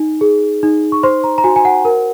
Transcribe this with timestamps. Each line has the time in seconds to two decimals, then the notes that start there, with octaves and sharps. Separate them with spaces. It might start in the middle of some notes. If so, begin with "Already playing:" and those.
Already playing: D#4
0.21 G#4
0.63 D#4
0.92 C#6
1.03 C5 C6
1.24 A#5
1.38 A#5
1.44 F#4 G#5
1.56 G#5
1.65 F#5
1.85 A#4